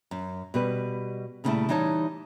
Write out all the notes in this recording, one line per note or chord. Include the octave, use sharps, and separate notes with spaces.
F#2
B2 G3 B4
A#2 C#3 E3 G3 A3 E4
E3 G3 D#4 C#5 A5